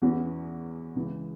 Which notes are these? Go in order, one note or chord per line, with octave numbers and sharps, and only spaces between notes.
E2 E3 C#4 F#4
C#2 C#3 E3